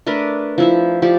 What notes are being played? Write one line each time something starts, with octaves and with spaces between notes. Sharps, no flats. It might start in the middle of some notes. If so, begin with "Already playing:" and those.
A3 D4 A#4 B4
F3 E4 E5
F3 G4 D5